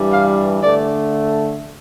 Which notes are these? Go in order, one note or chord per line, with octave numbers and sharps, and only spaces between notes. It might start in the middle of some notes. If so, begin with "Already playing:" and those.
Already playing: G2 E3 G3
F5
D3 A3 D5